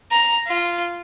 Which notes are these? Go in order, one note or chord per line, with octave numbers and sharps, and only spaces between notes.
A#5
F4